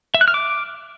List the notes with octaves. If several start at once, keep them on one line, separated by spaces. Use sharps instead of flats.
E5
F#6
F6
D6